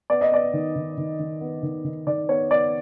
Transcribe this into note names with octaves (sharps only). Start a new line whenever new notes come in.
B3 D5
D#5
B3 D5
D#3
D#3
D#3
D#3
B3
D#3
D#3
D#3 D5
B3 C#5
B3 D5